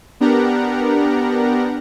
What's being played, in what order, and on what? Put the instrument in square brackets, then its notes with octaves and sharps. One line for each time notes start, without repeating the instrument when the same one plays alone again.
[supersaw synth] B3 D4 G4 A#4 F#5 A#5